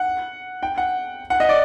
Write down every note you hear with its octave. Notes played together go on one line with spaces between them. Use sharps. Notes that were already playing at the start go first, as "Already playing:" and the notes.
Already playing: F#5
G5
F#5
F#5
D#5
D5